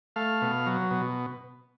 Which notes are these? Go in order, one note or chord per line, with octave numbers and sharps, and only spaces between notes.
A3 F5
B2
F#3
B2